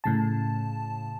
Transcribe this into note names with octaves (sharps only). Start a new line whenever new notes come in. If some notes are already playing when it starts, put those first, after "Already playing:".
A2 C#3 A5